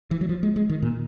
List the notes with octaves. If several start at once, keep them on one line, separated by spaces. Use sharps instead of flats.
E3
F#3
F3
G#3
G#3
D#3
A#2